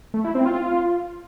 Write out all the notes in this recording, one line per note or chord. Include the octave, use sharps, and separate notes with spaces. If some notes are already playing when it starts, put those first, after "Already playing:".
A3
E4
C4
F4